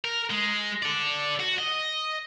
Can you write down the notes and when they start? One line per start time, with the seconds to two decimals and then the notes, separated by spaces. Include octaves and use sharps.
0.05 A#4
0.30 G#3
0.82 A4 D5
1.40 F#4
1.58 D#5